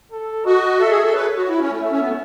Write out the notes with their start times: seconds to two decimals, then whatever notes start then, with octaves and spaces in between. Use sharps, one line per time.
0.12 A4
0.45 F#4 D#5
0.80 A4 E5
0.91 G#4
1.03 A4
1.14 B4 C#5
1.37 F#4
1.48 E4
1.59 C#4
1.71 A3
1.82 A3 E5
1.91 C#4
2.00 B3
2.09 A3